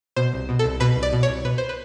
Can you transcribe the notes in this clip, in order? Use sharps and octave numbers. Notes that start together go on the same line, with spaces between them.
B2 C5
C2
B2
A4
C2
B2 B4
C2
D5
B2
C#5
C2
B2 B4
C5
B4